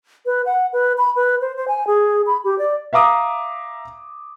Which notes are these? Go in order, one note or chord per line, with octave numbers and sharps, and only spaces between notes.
B4
F#5
B4
B5
B4
C5
C5
G#5
G#4
B5
G4
D5
E5 F5 A#5 D6 D#6